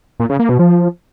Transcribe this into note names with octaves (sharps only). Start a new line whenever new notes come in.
A#2
C#3
A#3
B2
F3